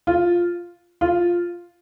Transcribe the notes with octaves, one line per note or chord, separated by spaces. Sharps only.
F4
F4